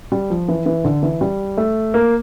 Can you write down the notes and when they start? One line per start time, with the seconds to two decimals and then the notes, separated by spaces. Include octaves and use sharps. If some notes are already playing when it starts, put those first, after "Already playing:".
0.12 G3
0.30 F3
0.48 E3
0.66 E3
0.84 D3
1.03 E3
1.21 G3
1.57 A3
1.94 A#3